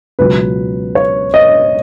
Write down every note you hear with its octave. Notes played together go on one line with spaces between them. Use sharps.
C#2 B2 F#3 B4
C#5
D#5